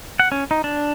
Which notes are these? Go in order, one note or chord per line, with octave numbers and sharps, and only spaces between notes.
F#5
C#4
D#4
D4